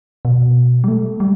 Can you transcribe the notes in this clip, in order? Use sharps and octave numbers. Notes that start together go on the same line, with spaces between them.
B2
G3
A3
G3